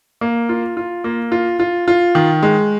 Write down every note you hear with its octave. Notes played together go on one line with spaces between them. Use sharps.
A#3
F4
F4
A#3
F4
F4
F4
D#3
G#3